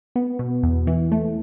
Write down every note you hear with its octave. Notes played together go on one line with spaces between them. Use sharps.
B3
B2
E2
E3
A3